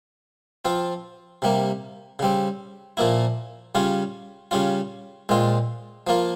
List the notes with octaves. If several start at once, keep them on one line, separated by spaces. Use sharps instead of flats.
F3 C4 F4
C3 G3 A#3
C#3 G3 C4
A#2 F3 A#3 E4
C#3 G3 C#4 F4
C#3 G3 C#4 F4
A#2 G#3 C4 F4
F3 A#3 F4